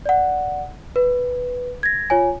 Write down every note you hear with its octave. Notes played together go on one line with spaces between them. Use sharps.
D5 F#5
B4
G#6 A#6
F4 C#5 G#5